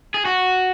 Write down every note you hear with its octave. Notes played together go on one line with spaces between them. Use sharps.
G#4
F#4